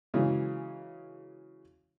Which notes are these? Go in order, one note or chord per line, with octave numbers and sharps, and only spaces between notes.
C#3 E3 F#3 G#3